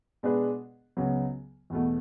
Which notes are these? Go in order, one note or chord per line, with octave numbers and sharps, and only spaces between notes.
B2 G#3 D4 G#4 B4
C#2 C#3 F#3 B3
E2 B2 A3